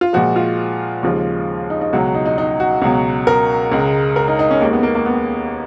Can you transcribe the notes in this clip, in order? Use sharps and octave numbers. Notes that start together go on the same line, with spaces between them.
F4
A#2 F3 G#3 F#4
F4
D#2 C#3 F3 G#3
D#4
D#4
C#2 B2 F#3 F#4
D#4
D#4
D#4
F#4
C#2 B2 F#3
A#4
C#2 C#3 G#3
A#4
D#4
D#4
C#4
D#2 D#3 G#3 A#3
B3
A#3
A#3
B3